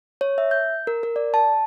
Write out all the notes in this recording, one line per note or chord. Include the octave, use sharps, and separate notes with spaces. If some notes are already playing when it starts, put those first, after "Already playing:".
C#5
E5
G6
A#4
A#4
D5
A5